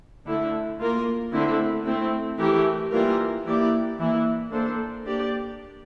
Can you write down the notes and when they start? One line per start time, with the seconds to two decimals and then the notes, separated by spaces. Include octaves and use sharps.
0.27 D3 A3 E4
0.80 A#3 F4 A#4
1.32 D3 A3 C4 E4
1.86 A3 C4 E4
2.38 E3 A3 E4 G4 A#4
2.92 E3 G3 A#3 F4 A#4
3.45 E3 A#3 E4 G4 D5
3.99 E3 A#3 E4
4.51 A#3 D4 A4 C5
5.05 A#3 D4 G4 D5